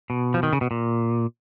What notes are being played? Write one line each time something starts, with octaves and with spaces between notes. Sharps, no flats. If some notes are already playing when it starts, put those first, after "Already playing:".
B2
F3
D#3
C#3
B2
A#2